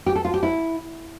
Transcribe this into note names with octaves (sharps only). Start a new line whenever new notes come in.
G4
A4
F4
G4
E4